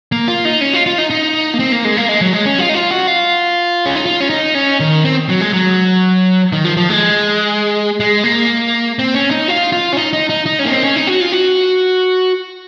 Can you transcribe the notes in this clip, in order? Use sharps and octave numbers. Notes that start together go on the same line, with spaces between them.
A#3
F4
D#4
C#4
F4
F4
D#4
D#4
A#3
C4
A#3
G#3
A#3
G#3
F#3
G#3
C#4
F4
D#4
F4
F#4
F4
C#4
D#4
F4
C#4
D#4
C#4
D#3
C4
F#3
G#3
F#3
D#3
F3
F3
G#3
G#3
A#3
C4
C#4
D#4
F4
F4
C#4
D#4
D#4
D#4
D#4
C#4
A#3
C4
C#4
D#4
F#4
F4
F#4